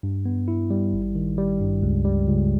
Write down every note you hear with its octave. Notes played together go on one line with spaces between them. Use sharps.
G2
B3
E4
G3
G#1
D#3
G3
G2
C#2
G3
C#2